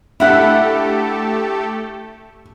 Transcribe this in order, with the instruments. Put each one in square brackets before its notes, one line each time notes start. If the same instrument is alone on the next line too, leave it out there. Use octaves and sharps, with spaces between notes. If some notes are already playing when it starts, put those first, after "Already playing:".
[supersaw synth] A3 G4 A4 [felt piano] D4 [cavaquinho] E4 F#5 B5